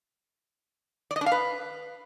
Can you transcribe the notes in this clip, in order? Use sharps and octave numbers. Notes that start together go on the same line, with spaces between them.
D5
D#5
D4
F5
B4